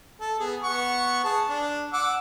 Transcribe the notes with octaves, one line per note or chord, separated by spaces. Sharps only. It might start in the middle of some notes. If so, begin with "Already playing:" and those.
A4
B3 G#4
B3 F#5 C#6
G#4 A5
D4
F#5 D6 E6